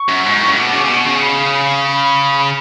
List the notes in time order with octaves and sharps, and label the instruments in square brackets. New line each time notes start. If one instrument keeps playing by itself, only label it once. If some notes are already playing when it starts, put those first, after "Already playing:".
Already playing: [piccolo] C#6
[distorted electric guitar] F#2
G#2
A2
C#3
[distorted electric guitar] B2 [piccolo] D6
[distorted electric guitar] C#3
C#3
[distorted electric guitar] B2 [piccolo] C#6
[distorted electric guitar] C#3
[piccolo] B5
B5
B5